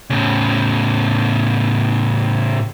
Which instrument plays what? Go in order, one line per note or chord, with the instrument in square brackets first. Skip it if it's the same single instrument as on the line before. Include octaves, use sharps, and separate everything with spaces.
[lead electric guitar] A2 C#3